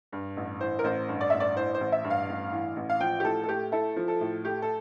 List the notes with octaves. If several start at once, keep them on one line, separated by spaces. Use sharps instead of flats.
G2
A1
E3 C5
A#4
A1 C5
G2
D5
A1 E5
D5
E3 C5
C5
A1
E5
G2
F5
A1
E3
A1
F5
F3 G5
G4
A2 A4
A4
A3 G4
E4 A4
F3
A4
A2
A3 G4
A4